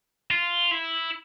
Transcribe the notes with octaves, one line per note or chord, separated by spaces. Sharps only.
F4
E4